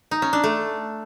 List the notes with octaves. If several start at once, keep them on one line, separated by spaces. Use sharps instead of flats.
D#4
C#4
D4
A3